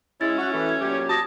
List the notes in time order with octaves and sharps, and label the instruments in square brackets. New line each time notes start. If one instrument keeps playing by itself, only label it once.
[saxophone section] G#3 E4 [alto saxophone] C#4 [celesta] A6
[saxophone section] F#4
E3 A3
[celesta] G#6
[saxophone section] A#2 F#3 G4
[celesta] F#4 D#6 A#6 [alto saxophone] A5